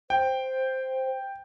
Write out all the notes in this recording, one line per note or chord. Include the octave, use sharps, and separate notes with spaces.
C5 G5